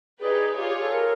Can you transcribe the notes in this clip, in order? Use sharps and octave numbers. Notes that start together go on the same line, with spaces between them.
D#4 G4 G#4 B4 D5
F4 G4 G#4 C#5
G4
A4
A#4